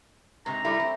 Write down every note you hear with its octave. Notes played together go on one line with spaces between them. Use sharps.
G#2 C3 A#5
G3 A3 E4
C4